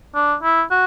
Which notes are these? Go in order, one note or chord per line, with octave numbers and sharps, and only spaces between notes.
D4
E4
F#4